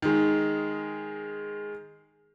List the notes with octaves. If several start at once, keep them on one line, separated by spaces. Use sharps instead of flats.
D#3 G#3